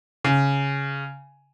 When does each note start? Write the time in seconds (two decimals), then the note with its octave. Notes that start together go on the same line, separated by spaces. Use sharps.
0.24 C#3